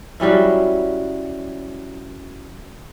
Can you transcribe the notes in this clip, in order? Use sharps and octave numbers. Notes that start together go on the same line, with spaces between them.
F#3 G3 C#4 E4